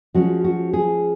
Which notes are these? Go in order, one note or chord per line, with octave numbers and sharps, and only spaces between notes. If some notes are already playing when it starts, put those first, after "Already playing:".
F3 G#3 C#4 F#4
F#4
G#4